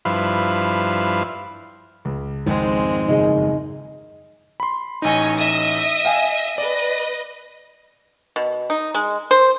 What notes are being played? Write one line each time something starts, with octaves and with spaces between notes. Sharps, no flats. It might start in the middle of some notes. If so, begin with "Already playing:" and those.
G2 F3 E4 B4 F5
C#2
F2 G#2 D#3 G#3 C4
F#1 D#4 G#4 D#5
B5 C6
A1 D#4 C#5 D#5 G#5
D#5 E5 D#6
F5 G5 G#5
B4 D5 D#5
B2
D#4
G#3
C5